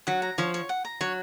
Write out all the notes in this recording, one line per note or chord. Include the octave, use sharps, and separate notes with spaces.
F#3 F#5
A#5
F3 C#5
C#5
F#5
A#5
F#3 C#5